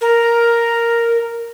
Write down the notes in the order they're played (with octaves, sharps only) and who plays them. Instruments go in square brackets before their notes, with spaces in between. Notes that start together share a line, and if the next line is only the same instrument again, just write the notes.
[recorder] A#4